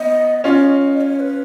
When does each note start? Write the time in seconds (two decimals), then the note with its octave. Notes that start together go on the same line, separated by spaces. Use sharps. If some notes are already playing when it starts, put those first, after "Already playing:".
Already playing: B3 D#5
0.44 C#4 F4 D#5
1.01 C#5
1.20 B4